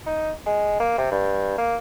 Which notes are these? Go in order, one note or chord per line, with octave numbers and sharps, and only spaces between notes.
D#4
G#3
A#3
C3
G2
A#3